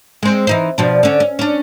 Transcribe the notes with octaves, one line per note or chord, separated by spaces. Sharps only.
G#3 C4
E3 D#4 C5
B2 F3 D4
D3 C#4
C#4
C#4 D4